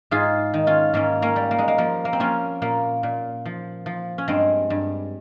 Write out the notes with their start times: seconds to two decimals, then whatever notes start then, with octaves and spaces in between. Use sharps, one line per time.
0.11 G#2 F4 G#4
0.54 D#3
0.67 C#4 F4
0.94 G#2 A#3 C#4
1.22 A#3 C#4
1.36 G3
1.51 A#3
1.59 G#3
1.68 A#3
1.78 F3 A#3
2.05 A#3
2.13 C4
2.20 F3 A#3 C#4
2.62 A#2 A#3
3.03 A#2
3.45 F3
3.86 F3
4.18 C#4
4.28 G2 G#3 C4
4.70 G2